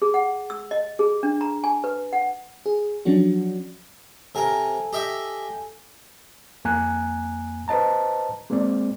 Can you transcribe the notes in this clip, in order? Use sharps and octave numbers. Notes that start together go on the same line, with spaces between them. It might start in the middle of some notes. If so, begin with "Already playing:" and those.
G#4
F#5
E6
D#5
G#4
D4
A#5
G#5
B4
F#5
G#4
F3 F#3 C#4 D4 F#4
C3 A4 A#4 G#5
G4 D#5 E5
F2 A#3 G#5 A#5 F#6
B4 C5 D#5 A5 A#5
G#3 A#3 C4 D5